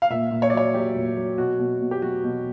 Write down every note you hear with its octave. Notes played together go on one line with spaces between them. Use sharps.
F5
A#2 E5
A#2
C#5
D5
F#3 C#5
F#3 G4
A#2
F#3
B2 F#4
B2
B2
G4
F#3 F#4
B2